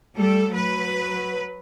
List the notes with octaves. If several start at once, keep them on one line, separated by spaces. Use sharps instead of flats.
G3 A3 A4
F#3 B4